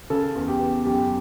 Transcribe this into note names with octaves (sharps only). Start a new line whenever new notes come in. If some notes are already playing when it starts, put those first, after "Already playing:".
C#3 A4
E2
G4
B3
F#2 G4